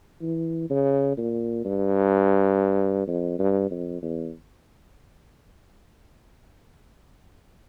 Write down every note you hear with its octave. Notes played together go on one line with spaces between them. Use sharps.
E3
C#3
A#2
G2
F2
G2
F2
E2